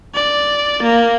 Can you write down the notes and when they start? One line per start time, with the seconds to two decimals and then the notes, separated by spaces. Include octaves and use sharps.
0.15 D5
0.83 A#3